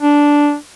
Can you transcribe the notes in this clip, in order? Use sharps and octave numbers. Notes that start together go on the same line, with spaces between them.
D4